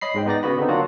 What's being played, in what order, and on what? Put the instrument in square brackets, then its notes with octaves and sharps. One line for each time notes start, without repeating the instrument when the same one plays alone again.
[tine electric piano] C#5 D#5 B5 C7
G#2 G#3 G5
B3 D#4 D5 A#6
C#3 B3 F#4 B5
D3 B3 C4 D#4
F#3 A#3 D4 F4 F#4